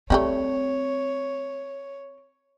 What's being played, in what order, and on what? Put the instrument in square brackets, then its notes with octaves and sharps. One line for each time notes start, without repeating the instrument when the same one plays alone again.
[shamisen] F3 G3 A3 [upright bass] C4 [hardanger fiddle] C#5